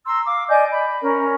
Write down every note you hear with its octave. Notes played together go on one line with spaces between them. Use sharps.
A#5 C6 E6
F5 D6
D5 D#5 G#5 G6
B5
C#4 A#4